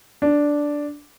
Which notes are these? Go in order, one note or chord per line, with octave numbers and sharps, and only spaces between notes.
D4